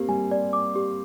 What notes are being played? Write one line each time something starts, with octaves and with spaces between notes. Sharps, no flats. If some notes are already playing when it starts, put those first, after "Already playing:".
Already playing: A#3 C4 G4
G3 G#5
D5
D6
G4